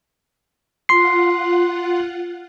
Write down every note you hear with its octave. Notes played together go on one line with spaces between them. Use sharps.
F4 F#5 C6 C7